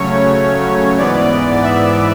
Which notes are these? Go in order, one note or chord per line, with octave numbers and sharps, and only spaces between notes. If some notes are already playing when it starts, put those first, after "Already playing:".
Already playing: C#3 F#3 A3 C#4 C#5
G#2 E3 B3 D5
E5